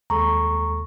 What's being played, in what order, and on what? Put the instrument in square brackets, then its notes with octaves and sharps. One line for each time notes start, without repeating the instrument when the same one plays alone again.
[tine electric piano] D#2 G#3 A4 [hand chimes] A#5 C#6